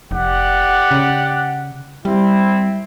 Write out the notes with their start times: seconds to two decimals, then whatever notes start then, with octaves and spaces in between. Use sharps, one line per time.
0.11 F1 G4 D5 F#5
0.91 C#3
2.05 G3 C4 E4